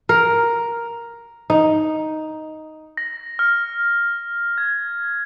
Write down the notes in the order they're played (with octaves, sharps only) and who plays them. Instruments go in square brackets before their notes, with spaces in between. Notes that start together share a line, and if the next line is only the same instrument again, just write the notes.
[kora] A#4
D#4
[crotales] A#6
F6
G#6